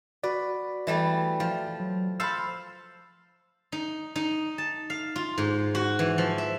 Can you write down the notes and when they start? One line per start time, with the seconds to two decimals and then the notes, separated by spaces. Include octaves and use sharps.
0.23 F#4 B4 D5
0.87 E3 G3 A3
1.40 F3
1.80 F#3
2.20 A4 C5 F5 B5 E6
3.72 D#4
4.16 D#4
4.58 A5
4.90 F5
5.16 F4
5.38 G#2
5.75 F#4
5.99 E3
6.18 F3
6.38 E5